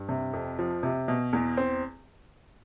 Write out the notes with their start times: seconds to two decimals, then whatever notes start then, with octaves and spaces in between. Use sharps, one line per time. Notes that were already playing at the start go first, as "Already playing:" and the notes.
Already playing: G2
0.09 C3
0.33 F2
0.59 F3
0.83 C3
1.08 B2
1.33 E2
1.57 C4